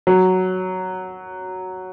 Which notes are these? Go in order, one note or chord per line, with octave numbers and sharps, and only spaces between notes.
F#3